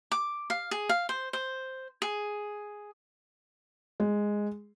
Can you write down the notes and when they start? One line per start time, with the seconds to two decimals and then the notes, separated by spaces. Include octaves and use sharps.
0.12 D6
0.50 F5
0.71 G#4
0.89 F5
1.09 C5
1.33 C5
2.02 G#4
4.00 G#3